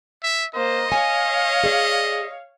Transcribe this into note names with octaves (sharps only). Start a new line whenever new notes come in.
E5
A#3 C5 D#5
C#5 F5 G#5
G#4 D5